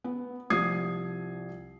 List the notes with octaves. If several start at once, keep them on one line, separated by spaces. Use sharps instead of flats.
B3
C2 F3 D#6 G#6 C7